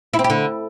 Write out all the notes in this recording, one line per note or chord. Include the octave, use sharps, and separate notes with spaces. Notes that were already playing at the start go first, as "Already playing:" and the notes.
E4
C4
G4
D3